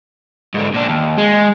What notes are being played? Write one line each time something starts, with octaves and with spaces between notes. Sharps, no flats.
G#2 D3
A#2 D4
D#2
G#3